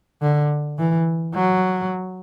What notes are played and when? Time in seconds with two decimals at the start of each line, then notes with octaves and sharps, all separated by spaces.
0.22 D3
0.79 E3
1.35 F#3